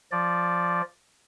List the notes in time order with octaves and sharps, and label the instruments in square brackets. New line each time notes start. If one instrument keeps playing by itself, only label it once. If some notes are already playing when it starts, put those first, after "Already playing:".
[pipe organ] F3 D5